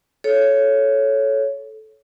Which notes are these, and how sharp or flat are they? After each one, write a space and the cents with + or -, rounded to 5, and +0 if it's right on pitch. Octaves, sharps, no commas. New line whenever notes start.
A4 -20 C#5 +0